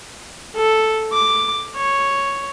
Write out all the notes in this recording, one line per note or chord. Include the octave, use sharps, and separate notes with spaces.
A4
D6
C#5